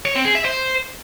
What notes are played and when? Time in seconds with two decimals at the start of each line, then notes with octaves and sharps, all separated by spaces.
0.05 C#5
0.15 C4
0.25 G#4
0.35 E5
0.45 C5